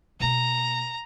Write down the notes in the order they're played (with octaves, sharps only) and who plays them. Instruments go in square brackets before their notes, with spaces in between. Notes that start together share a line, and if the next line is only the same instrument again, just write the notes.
[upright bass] B2 A#3 [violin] A#5